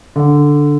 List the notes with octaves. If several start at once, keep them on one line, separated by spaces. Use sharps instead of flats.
D3